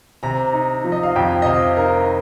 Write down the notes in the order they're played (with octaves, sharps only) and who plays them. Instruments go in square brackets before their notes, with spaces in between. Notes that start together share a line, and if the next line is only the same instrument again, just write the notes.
[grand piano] C3 [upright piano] A#5
[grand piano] D#4
F3
[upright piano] D#5
F5
[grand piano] F2 [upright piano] G5
[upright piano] D#5
[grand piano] C3 [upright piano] F5
[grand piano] D#4 [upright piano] A#4